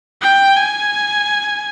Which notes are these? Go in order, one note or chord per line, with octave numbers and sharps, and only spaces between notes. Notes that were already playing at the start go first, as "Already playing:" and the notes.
G5
G#5